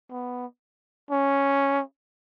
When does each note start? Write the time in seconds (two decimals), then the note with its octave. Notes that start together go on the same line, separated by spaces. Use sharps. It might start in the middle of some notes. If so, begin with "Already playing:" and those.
0.10 B3
1.11 C#4